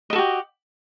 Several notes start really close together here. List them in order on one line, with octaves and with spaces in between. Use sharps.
D#5 A4 F#4 G4